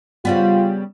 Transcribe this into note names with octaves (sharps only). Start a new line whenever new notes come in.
C#3 G3 B3 F4